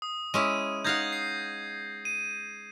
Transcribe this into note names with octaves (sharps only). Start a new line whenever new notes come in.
D#6
G#3 C#4 E4 D#7
D#4 F5 F#5 G6 G#6 A#6
C7
D#7